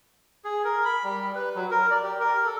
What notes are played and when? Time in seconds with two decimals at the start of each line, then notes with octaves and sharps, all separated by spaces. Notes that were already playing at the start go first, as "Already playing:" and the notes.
0.45 G#4
0.64 A#4
0.85 B5
1.04 G3
1.35 B4
1.56 F#3
1.71 A#4
1.91 D5
2.03 G4
2.20 A#4
2.46 A4